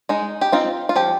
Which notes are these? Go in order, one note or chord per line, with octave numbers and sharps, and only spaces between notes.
G#3 D#4
G4
C4 D#4 F4
F4
F3 G4